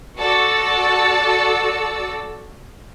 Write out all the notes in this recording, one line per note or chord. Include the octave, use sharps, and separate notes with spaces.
F#4 A4 D5 A5 E6 C#7